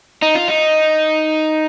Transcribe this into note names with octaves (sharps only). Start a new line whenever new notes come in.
D#4
F4
D#4